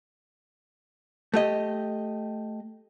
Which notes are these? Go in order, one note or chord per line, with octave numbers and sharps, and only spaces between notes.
A3 G4 D#5